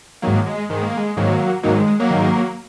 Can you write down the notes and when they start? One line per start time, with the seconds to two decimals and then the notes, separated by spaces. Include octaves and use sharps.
0.22 G#2 D#3 F#3 A#3
0.46 G#3
0.70 G#2 D#3 G#3
0.83 A#3
0.97 G#3
1.17 G#2 D#3 F#3 A#3
1.63 G#2 D#3 F#3 A#3
1.76 G#3
1.87 G#3
2.00 F#3 A#3
2.10 G#2 D#3